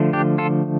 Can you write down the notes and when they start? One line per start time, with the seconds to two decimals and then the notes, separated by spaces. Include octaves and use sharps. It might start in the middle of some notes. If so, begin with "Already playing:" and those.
Already playing: D3 F3 A3
0.13 D4 G4
0.38 F4 A4